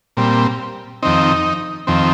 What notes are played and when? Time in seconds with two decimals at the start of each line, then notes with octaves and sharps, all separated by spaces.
0.17 A#2 G3 C4
1.02 F2 D#3 C4 D#4
1.87 F2 D#3 C4